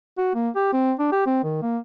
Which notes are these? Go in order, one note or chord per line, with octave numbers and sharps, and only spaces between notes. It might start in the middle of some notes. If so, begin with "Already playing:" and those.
F#4
A#3
G4
C4
D4
G4
C4
D#3
A#3